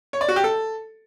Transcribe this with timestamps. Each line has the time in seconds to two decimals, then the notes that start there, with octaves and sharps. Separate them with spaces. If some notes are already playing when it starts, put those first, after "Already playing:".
0.13 C#5
0.21 D5
0.28 F#4
0.36 G4
0.44 A4